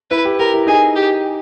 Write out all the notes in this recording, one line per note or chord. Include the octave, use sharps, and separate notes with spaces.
E4 B4
G4
G4 A#4
E4
D#4 G#4
G4